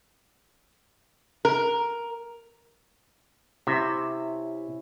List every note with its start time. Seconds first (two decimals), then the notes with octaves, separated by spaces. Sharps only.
1.45 A#4
3.67 C3 C#4 E4 E5